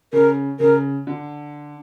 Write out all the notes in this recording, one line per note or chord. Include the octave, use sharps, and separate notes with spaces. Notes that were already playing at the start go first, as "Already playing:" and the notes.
C#3 A#4
C#3 A#4
D3